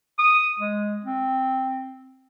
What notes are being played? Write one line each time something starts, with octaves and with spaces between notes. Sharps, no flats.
D#6
G#3
C4